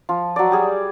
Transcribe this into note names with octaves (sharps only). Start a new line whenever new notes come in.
F3 F4
F#3 D5
G3 G#4